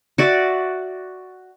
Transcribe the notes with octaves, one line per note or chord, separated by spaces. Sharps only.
F#4 D5 E5